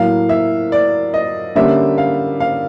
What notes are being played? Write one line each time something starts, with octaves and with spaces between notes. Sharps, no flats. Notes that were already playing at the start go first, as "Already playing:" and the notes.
Already playing: A2 F#3 A#3 F5
E5
D5
D#5
D3 G3 A#3 C#4 E5
F5
F5